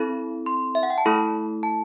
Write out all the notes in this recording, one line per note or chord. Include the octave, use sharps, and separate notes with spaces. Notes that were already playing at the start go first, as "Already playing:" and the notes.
Already playing: C4 E4 A4 B5
C6
E5
F#5
G5
A5
A3 E4 A4 B5
A5